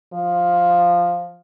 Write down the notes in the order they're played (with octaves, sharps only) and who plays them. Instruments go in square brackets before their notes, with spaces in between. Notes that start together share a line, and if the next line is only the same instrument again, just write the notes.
[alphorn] F3